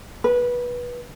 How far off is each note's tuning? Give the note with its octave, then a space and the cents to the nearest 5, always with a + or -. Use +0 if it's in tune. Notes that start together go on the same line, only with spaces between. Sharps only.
B4 -20